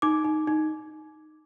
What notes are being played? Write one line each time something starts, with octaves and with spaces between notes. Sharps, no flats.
D#4 D6
D#4
D#4